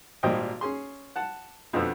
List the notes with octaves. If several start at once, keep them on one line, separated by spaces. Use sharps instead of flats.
G#1 A#2 G3 C5 D#5 G5
C#4 G#4 C6
F#5 A5
F2 B2 D3 F3 B3 E6